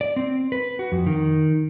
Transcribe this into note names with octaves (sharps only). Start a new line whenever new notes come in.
D5
C4
B4
F#4
F2
D#3